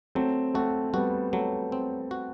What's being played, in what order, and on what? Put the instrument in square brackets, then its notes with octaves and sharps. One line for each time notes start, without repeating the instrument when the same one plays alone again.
[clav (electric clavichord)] F#3 [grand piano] A3 C4
[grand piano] A3 C4 [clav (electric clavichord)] F#4
[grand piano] G3 B3 [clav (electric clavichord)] F#4
[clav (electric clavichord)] F#3 [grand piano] A3
[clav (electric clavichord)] C4
F#4